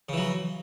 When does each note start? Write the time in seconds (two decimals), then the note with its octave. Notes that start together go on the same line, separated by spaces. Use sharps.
0.09 C#3
0.13 E3
0.17 F#3